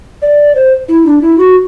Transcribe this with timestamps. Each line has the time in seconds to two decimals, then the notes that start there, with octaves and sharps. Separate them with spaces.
0.22 D5
0.55 C5
0.88 E4
1.06 D4
1.21 E4
1.38 F#4